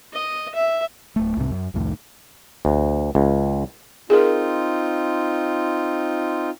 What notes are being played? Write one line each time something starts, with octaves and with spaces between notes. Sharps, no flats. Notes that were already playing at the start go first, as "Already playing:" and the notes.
D#5
E5
D1 A3
C2 G#2 C3
F#2
C2 F2 A2 D#3
D2
C#2
C4 D#4 F4 G#4 A#4